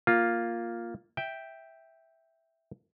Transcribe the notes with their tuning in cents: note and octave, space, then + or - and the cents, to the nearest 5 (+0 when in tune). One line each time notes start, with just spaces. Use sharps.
A#3 +0 F4 +0
E5 -5 G5 +0